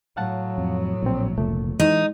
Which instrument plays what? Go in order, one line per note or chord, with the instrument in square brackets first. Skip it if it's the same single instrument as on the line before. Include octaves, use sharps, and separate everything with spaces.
[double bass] A2 F#3 [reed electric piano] F5 F#5 A5
[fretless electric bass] F2
[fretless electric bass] A#1 [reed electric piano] A#2 C4
[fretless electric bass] F1 A#2 [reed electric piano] C#2 A3
[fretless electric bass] E3 [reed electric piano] G#3 [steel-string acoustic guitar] D#4